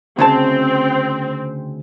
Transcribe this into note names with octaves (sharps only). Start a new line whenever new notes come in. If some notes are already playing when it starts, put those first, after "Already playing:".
D2 C#3 C4 A5